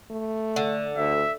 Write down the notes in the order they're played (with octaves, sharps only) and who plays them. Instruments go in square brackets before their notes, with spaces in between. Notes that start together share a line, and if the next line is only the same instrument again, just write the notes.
[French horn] A3
[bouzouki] D3
[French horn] D2 [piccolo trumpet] E5